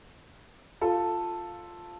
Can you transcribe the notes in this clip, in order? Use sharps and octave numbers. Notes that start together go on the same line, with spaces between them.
F4 A4